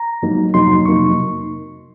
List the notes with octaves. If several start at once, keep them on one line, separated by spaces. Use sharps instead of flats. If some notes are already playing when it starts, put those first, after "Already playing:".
Already playing: A#5
G#2 F#3 A#3 D#4
F2 C3 F#3 A#3 D#4 C6
F2 C3 F#3 A#3 D#4 C#6